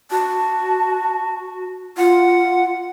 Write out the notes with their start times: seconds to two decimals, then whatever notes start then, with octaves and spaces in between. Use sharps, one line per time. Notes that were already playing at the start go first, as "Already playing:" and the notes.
0.11 F#4 A5
1.98 F4 F#5